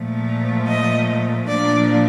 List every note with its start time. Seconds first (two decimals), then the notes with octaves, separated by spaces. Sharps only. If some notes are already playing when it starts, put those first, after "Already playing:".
Already playing: A#2 F3 A3
0.67 D#5
1.48 A#2 F3 A#3 D4 D5